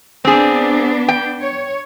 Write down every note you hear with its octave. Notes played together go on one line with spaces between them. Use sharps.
B3 C4 D4 G#4
G5
C#5